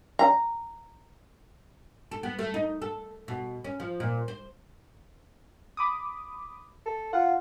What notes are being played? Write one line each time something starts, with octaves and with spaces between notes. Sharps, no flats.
A#5
A4
B3
A3
D#4
A4
B2
C#4
F3
A#2
C5
B5 D6 D#6
A4
F4 F#5